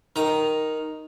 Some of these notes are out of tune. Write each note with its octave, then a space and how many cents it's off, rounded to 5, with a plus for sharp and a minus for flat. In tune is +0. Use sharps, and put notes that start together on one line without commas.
D#3 +0 A#5 +0